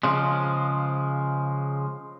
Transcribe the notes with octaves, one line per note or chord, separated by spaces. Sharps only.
C#3 F3 G#3